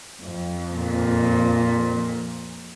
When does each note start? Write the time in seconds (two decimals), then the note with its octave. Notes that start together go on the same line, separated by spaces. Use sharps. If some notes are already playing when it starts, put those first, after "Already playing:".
0.22 F2
0.75 A#2